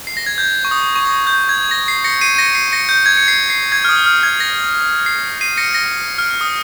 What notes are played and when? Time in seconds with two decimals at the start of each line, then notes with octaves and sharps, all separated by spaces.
0.07 C7
0.17 A#6
0.26 G#6
0.38 G6
0.65 C#6
0.71 D#6
0.96 C#6
1.05 D#6
1.27 G6
1.49 G#6
1.71 A#6
1.88 C7
2.04 A#6 C#7
2.21 C7 D#7
2.35 D#7
2.38 A#6 C#7
2.55 C7
2.72 A#6 C#7
2.89 G6
3.06 G#6
3.17 C#7
3.28 C7
3.50 C7
3.72 G#6
3.85 F6
3.89 D#6
4.06 F6
4.23 G#6
4.40 A#6
5.06 C7
5.41 C7 D#7
5.57 A#6 C#7
5.74 A#6
6.18 F6
6.41 D#6